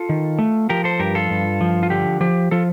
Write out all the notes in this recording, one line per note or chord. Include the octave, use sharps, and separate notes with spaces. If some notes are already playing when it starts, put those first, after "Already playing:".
Already playing: F4 A4
D#3
A3
F3 G4 A#4
A4 C5
G2 G4 A#4
F4 A4
G2
F3
F4
D3 G4
F3 G4
F3 F4 A4